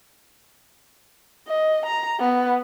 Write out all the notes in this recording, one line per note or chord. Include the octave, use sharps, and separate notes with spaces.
D#5
A#5
B3